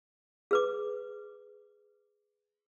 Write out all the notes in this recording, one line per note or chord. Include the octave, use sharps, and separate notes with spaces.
G#4 B4 D6